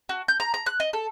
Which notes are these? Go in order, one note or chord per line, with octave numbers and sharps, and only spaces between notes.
F#4
G6
A#5
A#5
F#6
D#5
A4